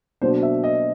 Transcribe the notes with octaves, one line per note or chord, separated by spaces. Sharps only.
B2 F#3 A#3 D4 C5
E5
D#5